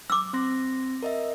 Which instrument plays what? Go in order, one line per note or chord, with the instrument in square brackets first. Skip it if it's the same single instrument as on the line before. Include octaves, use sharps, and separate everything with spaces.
[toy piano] D6 E6
[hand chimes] C4 C6 A#6
A#4 D#5 E5